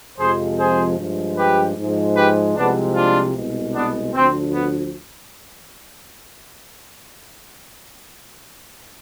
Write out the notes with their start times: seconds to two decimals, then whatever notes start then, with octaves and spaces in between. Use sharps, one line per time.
0.18 F2 C3 F3 G#3 G#4 C5
0.59 G#4 C5
0.97 G2 F3 G#3
1.37 G4 B4
1.77 G#2 F3 G#3
2.16 G4 B4
2.56 C2 C3 F3 G#3 B3 D4
2.95 D4 F4
3.35 C2 B2 G#3
3.75 B3 D4
4.14 D2 D3 F3 C4
4.54 B3